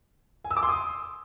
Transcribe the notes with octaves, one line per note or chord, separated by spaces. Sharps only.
G#5
E6
D6
C6
D#6